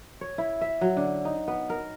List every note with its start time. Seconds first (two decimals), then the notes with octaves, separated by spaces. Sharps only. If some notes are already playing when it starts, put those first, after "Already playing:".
0.21 C#5
0.38 E4
0.61 E5
0.81 F#3
0.97 D3
1.25 D#4
1.48 B3
1.70 A#4